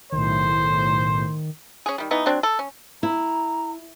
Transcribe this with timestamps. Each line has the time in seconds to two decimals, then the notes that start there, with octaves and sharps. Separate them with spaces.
0.12 B1 A2 D#3 C5
1.86 C#4 G#4
1.98 D#3 G3
2.11 E3 B3 D#4
2.26 F#3 C4 D4
2.43 A4
2.59 C#4
3.03 E4 A#5